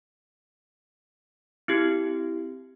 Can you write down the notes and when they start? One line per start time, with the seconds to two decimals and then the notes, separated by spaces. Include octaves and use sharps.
1.68 C4 E4 G4